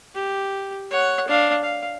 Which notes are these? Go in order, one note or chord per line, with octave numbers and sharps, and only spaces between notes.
G4
C#5 F#5
D4 F5
F5